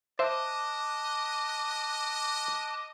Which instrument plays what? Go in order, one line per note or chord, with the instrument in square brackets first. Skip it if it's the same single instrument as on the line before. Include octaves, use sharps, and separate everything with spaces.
[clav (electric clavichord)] C5 E5 [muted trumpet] D#5 [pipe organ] A5 F#6 [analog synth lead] D6